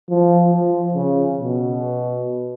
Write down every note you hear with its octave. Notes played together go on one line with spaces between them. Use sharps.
F3
F3
C#3
B2